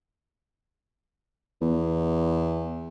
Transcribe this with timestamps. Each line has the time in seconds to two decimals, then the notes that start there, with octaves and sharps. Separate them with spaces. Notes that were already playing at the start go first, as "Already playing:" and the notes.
1.62 E2